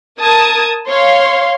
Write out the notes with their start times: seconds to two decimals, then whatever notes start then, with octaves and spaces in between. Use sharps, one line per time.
0.19 A#4 A5 D#6 G#6
0.87 C#5 F5 C6